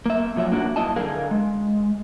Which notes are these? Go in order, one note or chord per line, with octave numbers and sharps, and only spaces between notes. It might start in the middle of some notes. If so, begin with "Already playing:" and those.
A#3 E5
A#2 F3 F#3 E5
A#3 D4 F#4
G2 E4 D#5 A5
D3 G#4 A#4 F5
G#3